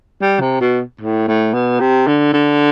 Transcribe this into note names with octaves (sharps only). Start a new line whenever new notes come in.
G3
C3
B2
A2
A2
B2
C3
D3
D3